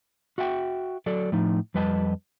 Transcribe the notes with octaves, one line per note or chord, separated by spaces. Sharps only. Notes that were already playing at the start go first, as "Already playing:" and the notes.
F#4 E5 F#5 G5
F#3 A4 D5
A2 F3 D#4
F2 G3 B4 D#5 G#5 A5